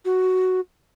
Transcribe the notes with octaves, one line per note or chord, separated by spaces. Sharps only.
F#4